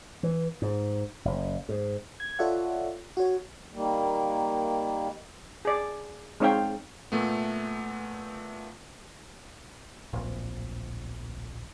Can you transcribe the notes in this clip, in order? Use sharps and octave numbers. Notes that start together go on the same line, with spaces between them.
E3
G#2
F#1
G#2
G#6
F4 A4 C#5 D5 E5 F#5
F#4 C#5
D#3 G3 A#3
G#4 D5
G#3 C4 D#4 C#5 F5 G5
A#2 A3 B3
D1 A#1